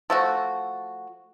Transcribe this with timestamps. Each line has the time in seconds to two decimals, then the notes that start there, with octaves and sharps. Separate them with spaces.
0.10 F3 A3 F#4